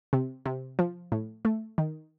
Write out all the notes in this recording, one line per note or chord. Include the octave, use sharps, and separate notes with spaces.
C3
C3
F3
A2
A3
D#3